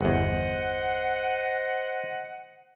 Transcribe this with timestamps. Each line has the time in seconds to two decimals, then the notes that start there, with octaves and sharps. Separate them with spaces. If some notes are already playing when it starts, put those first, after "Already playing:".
0.01 G1 E2 C5 D#5 F#5